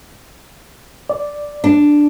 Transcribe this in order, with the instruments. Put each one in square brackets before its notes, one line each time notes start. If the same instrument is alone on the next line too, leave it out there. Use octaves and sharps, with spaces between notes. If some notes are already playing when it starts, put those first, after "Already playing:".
[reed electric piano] D5
[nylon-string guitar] D4